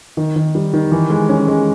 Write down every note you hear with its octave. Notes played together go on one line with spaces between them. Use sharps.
D#3
D#3
G3
D#3
E3
G#3
C#4
G#3